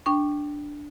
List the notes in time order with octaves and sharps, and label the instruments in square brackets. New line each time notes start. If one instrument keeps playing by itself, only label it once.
[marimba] D4 G5 C#6